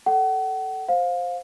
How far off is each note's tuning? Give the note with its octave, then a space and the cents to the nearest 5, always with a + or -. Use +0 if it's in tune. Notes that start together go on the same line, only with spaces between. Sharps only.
A4 +0 F#5 +35
C5 +5 F5 +20